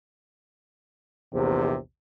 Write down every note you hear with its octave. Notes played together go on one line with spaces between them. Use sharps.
A#1 E2 C3